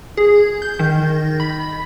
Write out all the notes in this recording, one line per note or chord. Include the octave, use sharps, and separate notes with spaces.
G#4
G6
D#3
B5